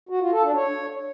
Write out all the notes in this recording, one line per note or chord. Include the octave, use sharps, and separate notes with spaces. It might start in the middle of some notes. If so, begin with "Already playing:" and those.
F#4
F4
A4
D4
C#5